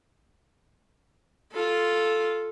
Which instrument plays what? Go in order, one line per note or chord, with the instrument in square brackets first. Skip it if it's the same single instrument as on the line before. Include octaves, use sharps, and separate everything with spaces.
[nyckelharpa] F4 A4